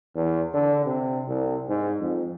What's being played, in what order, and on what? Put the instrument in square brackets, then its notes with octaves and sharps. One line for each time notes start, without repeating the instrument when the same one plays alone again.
[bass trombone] E2
D3
C3
C2
G#2
F2